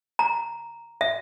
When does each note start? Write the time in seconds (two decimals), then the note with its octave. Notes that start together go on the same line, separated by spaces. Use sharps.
0.19 A#5
1.01 E5